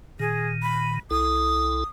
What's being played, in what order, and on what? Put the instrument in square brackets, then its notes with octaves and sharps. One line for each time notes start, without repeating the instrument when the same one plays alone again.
[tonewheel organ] A#2 D#3 [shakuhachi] G#4
[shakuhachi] B5
[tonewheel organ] C2 E4 A4 [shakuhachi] D#6